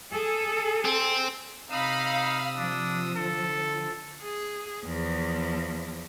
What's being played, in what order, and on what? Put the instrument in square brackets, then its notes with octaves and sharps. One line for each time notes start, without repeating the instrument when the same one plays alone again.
[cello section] G#4 A4
[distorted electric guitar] C4
[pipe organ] C3 D#6 E6 [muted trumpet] D#4 [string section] F5 B5
[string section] F3 [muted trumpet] D4
[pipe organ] D3 [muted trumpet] A4
[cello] G#4
E2 F3